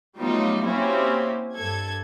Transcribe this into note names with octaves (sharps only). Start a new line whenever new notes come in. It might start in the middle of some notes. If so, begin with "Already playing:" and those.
F#3 G3 A3 B3 D#4 F4
A#3 C4 C#4 E4 F#4 G4
G2 A4 G#6